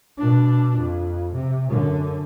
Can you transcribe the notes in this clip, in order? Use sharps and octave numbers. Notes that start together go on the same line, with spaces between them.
B2 D4
F2
C3
F#2 D3